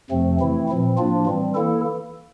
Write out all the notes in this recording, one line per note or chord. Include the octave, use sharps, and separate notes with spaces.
F2 C3 F3 A3 C4
E3 A3 C4 E4
A#2 F3 C4
A2 F3 A#3 D4 F4
E3 G3 C4
E3 A#3 E4 A4